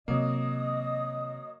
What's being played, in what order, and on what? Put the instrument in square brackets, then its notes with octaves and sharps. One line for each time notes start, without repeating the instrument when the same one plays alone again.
[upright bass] C3 D#3 [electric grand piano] F#3 A#3 [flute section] D#5 D#6